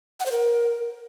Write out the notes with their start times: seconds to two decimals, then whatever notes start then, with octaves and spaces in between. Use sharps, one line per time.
0.20 F#5
0.26 C5
0.32 A#4